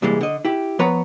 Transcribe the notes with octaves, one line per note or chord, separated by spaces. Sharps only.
C2 A#2 E3 G3 G#3
D3 D#5
E4 G4
F3 B3 B4 C#5 F#5 A#5